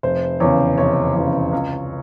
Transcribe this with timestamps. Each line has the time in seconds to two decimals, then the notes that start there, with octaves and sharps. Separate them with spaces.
0.03 F1 C5
0.40 E2 C#3 C#5
0.78 F1 C#5
1.15 E2 C#3
1.52 C#2